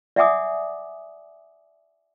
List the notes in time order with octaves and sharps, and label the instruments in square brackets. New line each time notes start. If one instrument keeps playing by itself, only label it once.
[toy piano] D5 E5 F#5 G#5 D6 D#6